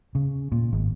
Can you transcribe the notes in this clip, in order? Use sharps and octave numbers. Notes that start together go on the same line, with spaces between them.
C#3
A#2
G#1